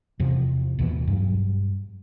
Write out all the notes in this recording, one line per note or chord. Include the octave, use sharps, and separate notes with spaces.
E2 C3 F3
A1 D#2 B2 E3
G2 F#3